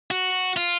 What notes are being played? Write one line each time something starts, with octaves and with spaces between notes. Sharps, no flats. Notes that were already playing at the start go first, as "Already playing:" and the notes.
F#4
F4